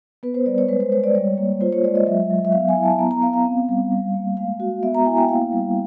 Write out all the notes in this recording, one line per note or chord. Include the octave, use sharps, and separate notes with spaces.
B3 B4
C5
G3 D5
C#5
G#3 B4
C5
G#3 C#5
D5
G3 C#5
A#3
F4 C5
C#5
G#3 D5
D#5
F#3 E5
F#3
E5
B3 F5
G#5
E4
A5
B3 A#5
A#5
B3 F5
F5
C4
G3
G3
A#3
G#3 F5
F#4
B3 E5
A#5
E4 G#5
G5
A#3 F5
G3